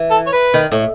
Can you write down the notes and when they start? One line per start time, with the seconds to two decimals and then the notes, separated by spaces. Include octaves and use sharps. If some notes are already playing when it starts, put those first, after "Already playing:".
Already playing: E3
0.11 A4
0.27 C#5
0.33 B4
0.54 D#3
0.72 A2